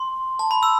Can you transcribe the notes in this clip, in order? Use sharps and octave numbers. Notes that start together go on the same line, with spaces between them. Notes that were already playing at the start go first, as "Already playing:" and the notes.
Already playing: C6
A5
B5
E6